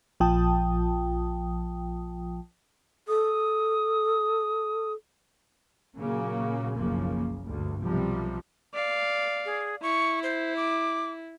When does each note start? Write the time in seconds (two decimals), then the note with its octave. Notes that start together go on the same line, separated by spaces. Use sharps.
0.20 A#1 F3 F4 G5 A5 D#6
3.08 A4 D#6
5.97 A#2 C#3 F#3 A#3
6.75 F#1 B1 F#2 C#3 F3 A#3
7.43 D2 G2
7.81 B1 C3 F3 G3
8.74 D5 F5
9.45 G#4
9.82 E4 C#6
10.23 C5
10.56 D6